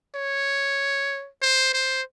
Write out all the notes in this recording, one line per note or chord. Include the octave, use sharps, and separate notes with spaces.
C#5
C5
C5